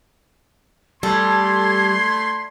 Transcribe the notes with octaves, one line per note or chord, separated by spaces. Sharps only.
G3 A3 A4 B5 C6 G#6